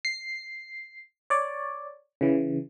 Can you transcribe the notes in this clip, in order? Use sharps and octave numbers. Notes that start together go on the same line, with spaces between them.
C7
C#5 D5
C#3 E3